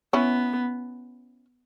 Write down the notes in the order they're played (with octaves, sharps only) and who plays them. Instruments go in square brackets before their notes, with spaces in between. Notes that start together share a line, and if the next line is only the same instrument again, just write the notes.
[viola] B3 [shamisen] C#4 E4